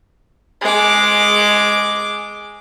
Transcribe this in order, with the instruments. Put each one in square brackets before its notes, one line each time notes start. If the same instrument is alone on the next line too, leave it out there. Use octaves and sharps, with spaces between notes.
[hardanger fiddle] G#3 D6